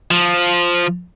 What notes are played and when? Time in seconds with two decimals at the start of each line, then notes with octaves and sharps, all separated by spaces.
0.11 F3